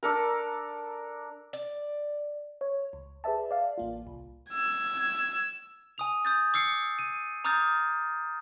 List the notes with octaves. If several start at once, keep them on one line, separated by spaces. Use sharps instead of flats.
D4 A4 A#4
D5
C#5
C#2
G#4 B4 D5 E5 A5
D5 F5
A1 A#3 F4
C2
E6 G#6
G#5 D#6 F7
D#6 G6 A6
D6 E6 C7 C#7
D#7
A#5 D6 D#6 F6 G6 A6